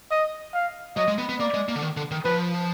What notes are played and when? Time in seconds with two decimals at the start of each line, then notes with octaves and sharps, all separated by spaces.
0.11 D#5
0.54 F5
0.97 F#3 D#5
1.08 G#3
1.18 B3
1.29 B3
1.40 A#3 D5
1.54 G#3
1.69 A#3
1.75 D3
1.82 D#3
1.97 D3
2.11 D#3
2.25 F3 B4